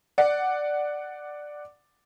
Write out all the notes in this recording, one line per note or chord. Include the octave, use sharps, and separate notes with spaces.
D5 F#5